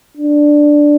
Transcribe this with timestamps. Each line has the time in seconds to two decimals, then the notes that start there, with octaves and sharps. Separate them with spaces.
0.17 D4